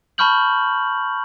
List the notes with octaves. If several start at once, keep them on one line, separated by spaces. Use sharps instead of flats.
A5 B5 C#6 F6 G6 F#7